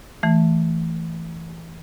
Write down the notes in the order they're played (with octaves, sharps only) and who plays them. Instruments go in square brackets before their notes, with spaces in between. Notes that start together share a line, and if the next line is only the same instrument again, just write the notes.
[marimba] E3 A3